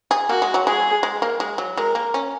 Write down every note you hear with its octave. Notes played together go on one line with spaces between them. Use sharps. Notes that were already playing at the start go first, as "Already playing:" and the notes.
G#4
A#3 F#4
G#3
F#3
G#3 G#4
G#3
A#3
G#3
F#3
G#3 A#4
A#3
C#4